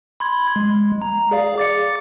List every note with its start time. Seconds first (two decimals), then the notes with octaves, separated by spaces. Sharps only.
0.20 B5 C6 G#6
0.56 G#3
1.02 A#5
1.31 G#4 D5 F5
1.58 D6 A6 C#7